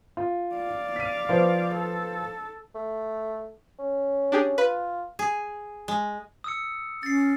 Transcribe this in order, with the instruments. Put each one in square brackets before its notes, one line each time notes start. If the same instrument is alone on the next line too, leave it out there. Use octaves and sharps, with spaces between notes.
[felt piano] F4
[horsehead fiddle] D5 F5
[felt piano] B6 D#7
F3 B4 C5
[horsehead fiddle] A4
[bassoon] A3
C#4
[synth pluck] D4 G4 G#4
[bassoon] F4 [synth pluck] B4
[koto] G#4
G#3
[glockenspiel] D#6 E6 C#7
[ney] C#4 [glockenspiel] A6 C7